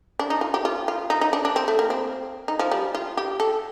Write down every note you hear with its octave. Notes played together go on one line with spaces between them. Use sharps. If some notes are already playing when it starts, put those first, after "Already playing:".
D4
D#4
F4
G4
F4
F4
D#4
D#4
D4
D4
C4
A3
A#3
C4
D#4
F3
G3
F4
G4
A4